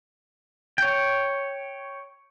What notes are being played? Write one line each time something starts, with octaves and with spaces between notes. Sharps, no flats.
C#5 G5